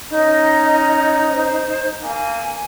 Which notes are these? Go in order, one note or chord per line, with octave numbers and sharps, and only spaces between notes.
C#4 D#4 D#5 A#5
C5
A#3 B3 G#5